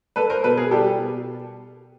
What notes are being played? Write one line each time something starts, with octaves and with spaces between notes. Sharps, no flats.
A#3 A4 B4
A#4 C5
B2 A4 B4
G#4 A#4
G3 G4 A4
B2